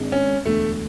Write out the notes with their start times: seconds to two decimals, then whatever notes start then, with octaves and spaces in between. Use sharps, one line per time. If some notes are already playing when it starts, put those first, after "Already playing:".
Already playing: G#1 G#2 G#3 D4
0.12 C#4
0.45 E1 D2 D3 A3